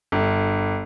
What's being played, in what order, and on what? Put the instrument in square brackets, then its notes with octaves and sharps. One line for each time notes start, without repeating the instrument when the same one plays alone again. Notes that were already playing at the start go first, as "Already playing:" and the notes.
[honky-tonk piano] G1